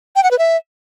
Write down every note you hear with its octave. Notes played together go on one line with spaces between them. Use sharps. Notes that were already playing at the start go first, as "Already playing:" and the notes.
G5
F#5
B4
E5